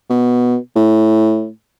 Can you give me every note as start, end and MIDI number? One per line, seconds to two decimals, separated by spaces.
0.10 0.57 47
0.76 1.49 45